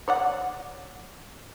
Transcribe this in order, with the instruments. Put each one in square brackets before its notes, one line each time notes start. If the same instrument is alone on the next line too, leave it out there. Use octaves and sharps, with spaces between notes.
[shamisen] C#5 D5 F#5